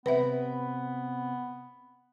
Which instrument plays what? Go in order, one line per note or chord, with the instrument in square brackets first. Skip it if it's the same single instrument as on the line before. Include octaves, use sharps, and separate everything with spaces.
[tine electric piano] C3 C4 B5 [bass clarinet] B3 [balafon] B4 E5